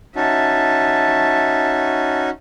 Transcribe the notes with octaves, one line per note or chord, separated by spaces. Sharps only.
C#4 D#4 F#4 E5 A5